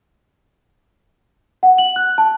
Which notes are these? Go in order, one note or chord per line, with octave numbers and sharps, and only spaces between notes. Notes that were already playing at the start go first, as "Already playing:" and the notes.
F#5
F#7
F#6
A5